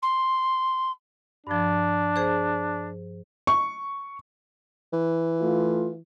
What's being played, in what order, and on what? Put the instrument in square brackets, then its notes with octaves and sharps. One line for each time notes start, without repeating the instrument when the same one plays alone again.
[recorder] C6
[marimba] G2 F3 [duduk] D4
[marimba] G#4 C5
[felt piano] C#6
[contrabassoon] E3
[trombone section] A3 E4 F4